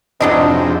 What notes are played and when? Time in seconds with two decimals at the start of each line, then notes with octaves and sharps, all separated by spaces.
0.20 F2 G#2 C3 F#3 D4 E4 D#5